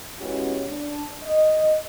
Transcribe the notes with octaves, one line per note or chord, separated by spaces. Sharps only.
G#3 B3 C#4 E4 F#4 G4
D4
D#5